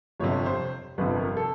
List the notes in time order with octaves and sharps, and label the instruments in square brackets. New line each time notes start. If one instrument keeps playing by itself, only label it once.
[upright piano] G1 F2 C3 C#5
C5
G1 F2 C3 B4
A#4
A4